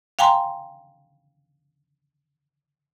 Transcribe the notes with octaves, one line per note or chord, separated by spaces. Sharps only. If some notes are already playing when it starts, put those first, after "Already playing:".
F5 G5 G#5 A#5 C6